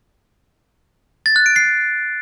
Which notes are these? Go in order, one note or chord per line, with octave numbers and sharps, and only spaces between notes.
A6
F#6
D7
C7